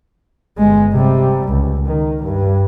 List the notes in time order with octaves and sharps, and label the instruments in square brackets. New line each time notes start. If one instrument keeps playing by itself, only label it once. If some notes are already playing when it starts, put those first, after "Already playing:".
[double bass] G1 G#3
C3 G3
C#2
D#3
G2